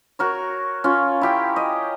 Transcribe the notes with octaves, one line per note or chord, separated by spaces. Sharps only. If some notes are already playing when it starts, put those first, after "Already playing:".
F#4 A#4 C#5
C#4 F4
E4 G4 G5
D#5